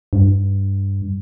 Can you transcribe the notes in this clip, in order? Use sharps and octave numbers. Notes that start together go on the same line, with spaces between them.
G2